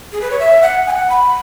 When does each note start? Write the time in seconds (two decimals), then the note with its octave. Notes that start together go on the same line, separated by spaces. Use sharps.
0.12 G#4
0.21 B4
0.30 C#5
0.39 E5
0.62 F#5
0.87 G#5
0.90 F#5
1.10 B5